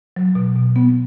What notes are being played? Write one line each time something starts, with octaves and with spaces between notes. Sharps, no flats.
F#3
B2
B2
B3